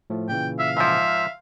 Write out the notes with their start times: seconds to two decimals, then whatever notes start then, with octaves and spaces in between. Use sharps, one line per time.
0.10 A2 F3 A3
0.29 A#2 C#3 E3 G5
0.59 E5 F5
0.77 G#2 F3 E5